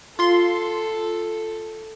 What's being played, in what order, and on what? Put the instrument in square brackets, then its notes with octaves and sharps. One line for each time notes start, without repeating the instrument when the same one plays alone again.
[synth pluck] F4 C6 [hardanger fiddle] A4